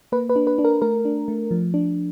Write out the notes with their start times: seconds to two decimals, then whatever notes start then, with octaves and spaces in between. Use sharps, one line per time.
0.12 A#3 B4
0.29 B4
0.36 D4
0.47 B4
0.58 D4
0.65 A#4
0.82 A3 A#4
1.05 D4
1.28 A3
1.51 F3
1.74 D4